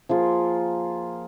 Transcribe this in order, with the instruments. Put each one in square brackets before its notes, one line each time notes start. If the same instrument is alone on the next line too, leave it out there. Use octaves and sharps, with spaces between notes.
[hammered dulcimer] F3 A#3 F4 G#4